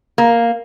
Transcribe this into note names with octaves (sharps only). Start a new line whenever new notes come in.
A#3